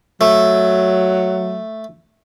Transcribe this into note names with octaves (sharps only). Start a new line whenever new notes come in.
F#3 A3